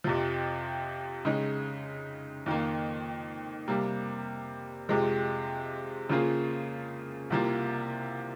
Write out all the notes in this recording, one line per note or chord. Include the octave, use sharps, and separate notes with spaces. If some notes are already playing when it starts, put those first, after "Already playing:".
F2 C3 F3
C#3 G#3 D#4
F2 D#3 A#3
C3 G3 A#3
F2 C3 F3 G#3
C#3 F3 A#3 F4 G#4
C2 C3 F3 A#3